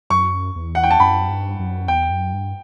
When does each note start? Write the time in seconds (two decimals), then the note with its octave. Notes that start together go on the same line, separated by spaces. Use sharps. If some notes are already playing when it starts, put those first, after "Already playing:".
0.10 F#2 C#6
0.56 E2
0.75 F#5
0.84 G5
0.91 A5
1.00 F#2 B5
1.28 G2
1.59 F#2
1.88 E2 G5
2.10 F#2
2.33 G2